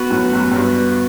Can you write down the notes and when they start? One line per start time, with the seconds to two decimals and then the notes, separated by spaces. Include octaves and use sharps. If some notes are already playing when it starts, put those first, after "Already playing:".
Already playing: B3 F#4 B4
0.11 F#2 A2
0.33 F#2
0.52 F#2
0.56 G2